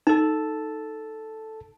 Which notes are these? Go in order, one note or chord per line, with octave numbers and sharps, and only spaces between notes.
D#4 A4 A5